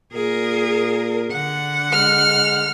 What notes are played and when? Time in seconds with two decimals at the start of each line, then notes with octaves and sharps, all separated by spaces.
0.13 A#2 G#4 A#4
1.32 D3 F#5
1.92 G#3 F6